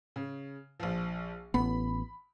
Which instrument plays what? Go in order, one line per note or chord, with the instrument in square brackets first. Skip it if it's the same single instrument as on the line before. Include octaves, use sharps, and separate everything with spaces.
[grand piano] C#3
A#1 F3
[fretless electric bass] A1 B3 [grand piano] B5